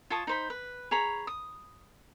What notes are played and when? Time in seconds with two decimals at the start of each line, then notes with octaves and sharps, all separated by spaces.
0.10 F4 C#5 A5 D#6
0.27 D#4 C5 B5
0.50 B4
0.91 G#4 C#5 A#5 B5
1.27 D#6